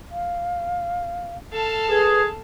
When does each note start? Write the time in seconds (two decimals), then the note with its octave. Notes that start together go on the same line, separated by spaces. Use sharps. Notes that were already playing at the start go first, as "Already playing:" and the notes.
0.11 F5
1.53 A4 F5 A5
1.89 G#4 B4